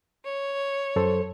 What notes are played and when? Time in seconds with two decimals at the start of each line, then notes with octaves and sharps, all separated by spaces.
0.22 C#5
0.96 F#2 A4 C5